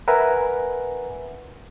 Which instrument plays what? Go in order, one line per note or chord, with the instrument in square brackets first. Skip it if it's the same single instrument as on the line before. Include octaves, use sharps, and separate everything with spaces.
[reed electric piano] A#4 B4 E5 F#5 G#5 A#5